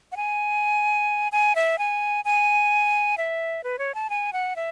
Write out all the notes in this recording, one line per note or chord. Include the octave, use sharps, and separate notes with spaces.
F#5
G#5
G#5
E5
G#5
G#5
E5
B4
C#5
A5
G#5
F#5
E5